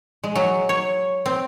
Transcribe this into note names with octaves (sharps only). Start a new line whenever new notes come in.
G#3
F#3
C#5
C4